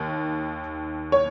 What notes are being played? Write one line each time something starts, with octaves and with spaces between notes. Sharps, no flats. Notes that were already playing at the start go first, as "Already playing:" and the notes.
Already playing: D#2 D#3
C#5